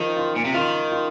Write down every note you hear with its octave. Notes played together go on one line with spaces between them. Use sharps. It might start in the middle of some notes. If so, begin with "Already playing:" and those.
Already playing: D#3 F3
F4
A#2
C3
D#3 F4
F4